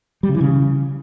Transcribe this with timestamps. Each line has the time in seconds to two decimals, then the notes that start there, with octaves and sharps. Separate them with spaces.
0.23 G3
0.29 C#3
0.35 E3
0.41 C#3